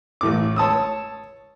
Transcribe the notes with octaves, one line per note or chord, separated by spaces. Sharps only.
A1 A2 D6
C#5 A5 D#6 E6